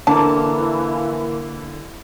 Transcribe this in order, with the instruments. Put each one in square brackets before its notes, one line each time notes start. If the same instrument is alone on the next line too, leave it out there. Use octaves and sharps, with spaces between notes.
[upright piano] D3 [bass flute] E3 [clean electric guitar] A#3 [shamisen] A5